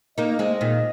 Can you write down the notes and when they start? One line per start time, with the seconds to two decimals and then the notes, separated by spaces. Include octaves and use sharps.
0.18 A#3 D#4 D#5
0.39 G#3 C4
0.61 A#2 D#3